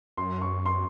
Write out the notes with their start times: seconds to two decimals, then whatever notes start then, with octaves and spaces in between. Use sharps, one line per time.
0.17 F#2 C6
0.41 C#6
0.66 C6